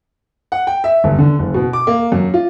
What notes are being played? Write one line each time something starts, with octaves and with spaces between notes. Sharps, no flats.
F#5
G5
E5
G1
D3
F#1
B2
D6
A#3
F#2
F4